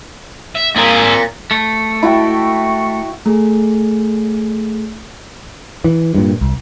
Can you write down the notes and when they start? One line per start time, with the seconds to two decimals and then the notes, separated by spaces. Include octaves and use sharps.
0.56 E5
0.76 A#2 C4 G#4 A#4
1.51 A3
2.03 E4 F#4 G5
3.26 A3 G#4
5.84 E3
6.14 G2 A#2
6.41 C2